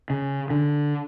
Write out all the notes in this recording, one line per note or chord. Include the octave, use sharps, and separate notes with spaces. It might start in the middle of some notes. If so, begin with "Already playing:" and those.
C#3
D3